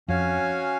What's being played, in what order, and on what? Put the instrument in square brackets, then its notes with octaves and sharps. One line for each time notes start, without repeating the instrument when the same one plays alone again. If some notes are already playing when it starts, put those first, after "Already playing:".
[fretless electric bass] F2 [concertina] C#4 F#4 C#5 F5 G#5